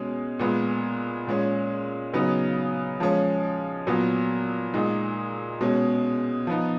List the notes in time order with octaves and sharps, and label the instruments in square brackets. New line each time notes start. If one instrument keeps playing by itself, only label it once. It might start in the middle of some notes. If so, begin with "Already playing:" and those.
Already playing: [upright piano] B2 G#3 C#4
A#2 G#3 B3
A#2 G#3 C#4
C#3 F#3 B3 D#4
F3 G#3 C#4
A#2 F#3 B3
A#2 G#3 D#4
B2 G#3 C#4
F3 B3 D#4